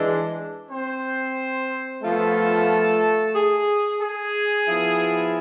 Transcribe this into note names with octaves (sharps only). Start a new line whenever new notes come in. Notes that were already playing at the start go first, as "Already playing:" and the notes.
Already playing: E3 G#3 D4
C4 C5
F3 A3 B3 F4 A4
G#4
G#4
F3 B3 E4